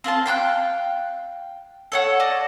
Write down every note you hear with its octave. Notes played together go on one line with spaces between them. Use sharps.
C4 F4 C5 A5
F5 G5 C6 F#6
A4 C#5 F#5
D5 D#5 A5